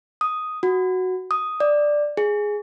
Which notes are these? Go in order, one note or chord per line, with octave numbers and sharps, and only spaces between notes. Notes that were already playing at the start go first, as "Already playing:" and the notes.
D#6
F#4
D#6
D5
G#4